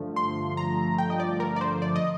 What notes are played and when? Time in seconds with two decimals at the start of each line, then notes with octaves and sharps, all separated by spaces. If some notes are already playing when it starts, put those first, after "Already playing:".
Already playing: G2 D3 F3 A3
0.16 C6
0.57 A#5
0.98 G5
1.10 D#5
1.20 D5
1.40 A#4
1.56 D5
1.61 C5
1.82 D5
1.96 D#5